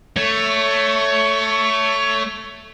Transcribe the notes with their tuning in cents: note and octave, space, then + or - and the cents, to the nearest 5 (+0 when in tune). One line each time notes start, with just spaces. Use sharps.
A3 +5 C#5 +15